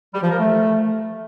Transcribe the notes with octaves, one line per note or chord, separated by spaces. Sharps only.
G3
F3
A#4
A3